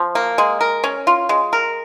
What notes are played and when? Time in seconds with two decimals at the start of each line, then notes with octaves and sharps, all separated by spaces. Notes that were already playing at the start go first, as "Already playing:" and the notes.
Already playing: F3
0.15 A#3
0.38 G#3
0.61 A#4
0.84 C#4
1.07 F4
1.29 G#3
1.53 A#4